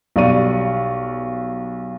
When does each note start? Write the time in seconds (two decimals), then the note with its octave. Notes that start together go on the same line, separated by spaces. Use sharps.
0.16 B1 G3 D5 F5 C#6 D#7